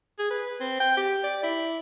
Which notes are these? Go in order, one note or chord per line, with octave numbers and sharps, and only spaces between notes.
G#4
B4
C4
G5
G4
D5
E4